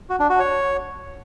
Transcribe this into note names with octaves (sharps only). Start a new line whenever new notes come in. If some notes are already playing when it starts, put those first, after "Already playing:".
F#4
D4
F#4
C#5